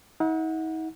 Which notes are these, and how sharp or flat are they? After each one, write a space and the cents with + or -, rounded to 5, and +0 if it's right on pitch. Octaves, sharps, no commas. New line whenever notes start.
D#4 +45 F#5 -20